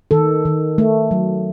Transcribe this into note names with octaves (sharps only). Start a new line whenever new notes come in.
D#3 A4
D#3
A3
F#3